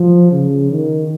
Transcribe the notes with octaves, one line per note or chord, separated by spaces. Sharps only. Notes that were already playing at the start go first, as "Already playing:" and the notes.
Already playing: F3
C#3
D#3